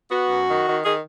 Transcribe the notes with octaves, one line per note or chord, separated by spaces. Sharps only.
B3 F#4
F#2
D#3
D#3
D#3 G#4